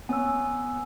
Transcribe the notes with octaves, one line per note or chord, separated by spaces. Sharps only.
B3 C#5 G#5 E6